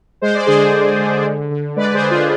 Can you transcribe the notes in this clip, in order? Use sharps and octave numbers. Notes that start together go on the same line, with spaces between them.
G#3 C5
D5
D3 G#4 C5
G#3
D3
D3
D3
G#3 B4 D5
G#4 C5
D3
F4 G#4